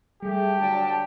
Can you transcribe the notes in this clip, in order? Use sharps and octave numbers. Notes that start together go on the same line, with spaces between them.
G3 A3 G4 G#4
D3 F#3 D4 G5 A5